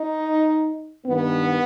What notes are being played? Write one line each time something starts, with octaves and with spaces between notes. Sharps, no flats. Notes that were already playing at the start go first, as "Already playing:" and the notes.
Already playing: D#4
G2 D#3 B3